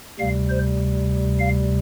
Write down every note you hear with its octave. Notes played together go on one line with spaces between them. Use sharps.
D2 C3 G3 F5
C5
F5